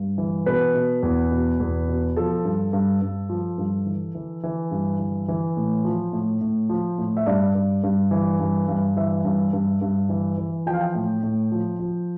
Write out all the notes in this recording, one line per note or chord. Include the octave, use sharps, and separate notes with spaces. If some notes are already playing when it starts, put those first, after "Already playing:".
Already playing: G2
E3
B2 B4
B2
E2
B2
E2
B2
F3 A4
G2
G2
G2
F3
G2
E3
E3
E3
G2
E3
E3
A2
F3
A2
A2
F3
A2
E5
G2 D5
G2
G2
E3
G2
G2
E3 E5
G2
G2
G2
E3
E3
F3 G5
F5
G5
A2
A2
F3
F3